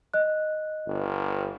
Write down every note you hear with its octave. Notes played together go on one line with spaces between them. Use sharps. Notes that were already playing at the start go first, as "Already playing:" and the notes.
D#5 F#6
G1